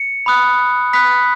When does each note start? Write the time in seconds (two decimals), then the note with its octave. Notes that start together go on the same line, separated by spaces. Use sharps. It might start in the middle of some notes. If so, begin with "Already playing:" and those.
Already playing: C#7
0.26 B5 D#6 F#6
0.93 B5 D#6 F#6 B6